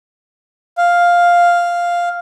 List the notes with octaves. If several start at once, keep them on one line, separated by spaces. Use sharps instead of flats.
F5